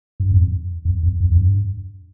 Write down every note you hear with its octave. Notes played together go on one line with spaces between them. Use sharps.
G2
F2
F2
F2
F2
F2
G2